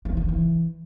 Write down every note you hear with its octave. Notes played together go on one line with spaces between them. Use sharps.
E3
D#3
E3